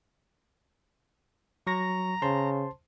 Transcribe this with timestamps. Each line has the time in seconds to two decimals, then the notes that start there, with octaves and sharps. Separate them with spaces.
1.67 F#3 A#5 C#6 A#6
2.22 C#3 C5 A5 C6